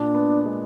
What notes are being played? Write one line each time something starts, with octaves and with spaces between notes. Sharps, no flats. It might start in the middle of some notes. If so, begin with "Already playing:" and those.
Already playing: A#2 A#3 D4
B3
G#3